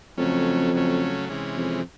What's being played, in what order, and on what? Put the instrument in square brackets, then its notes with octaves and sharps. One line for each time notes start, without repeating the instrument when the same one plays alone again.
[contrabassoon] F2 [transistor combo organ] C#3 F#3 A3 C#4
[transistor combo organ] C#3 F#3 A3 C#4
C3 E3 G#3 C#4
[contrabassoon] F2